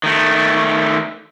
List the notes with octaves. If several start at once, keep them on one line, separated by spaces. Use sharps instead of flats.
D#3 A3